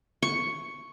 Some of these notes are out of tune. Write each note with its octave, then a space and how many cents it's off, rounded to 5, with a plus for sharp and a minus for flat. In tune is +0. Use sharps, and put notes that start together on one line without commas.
C#6 +5